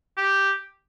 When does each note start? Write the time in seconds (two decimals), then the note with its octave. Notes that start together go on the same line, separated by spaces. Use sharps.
0.17 G4